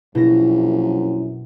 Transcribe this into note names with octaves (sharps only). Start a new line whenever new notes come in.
A#1 F#2 B2 E4 A#6